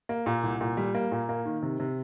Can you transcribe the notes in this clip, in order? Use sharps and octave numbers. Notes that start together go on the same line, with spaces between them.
A#3
A#2
C2
A#2
G3
A#3
A#2
A#3
D#3
C3
C3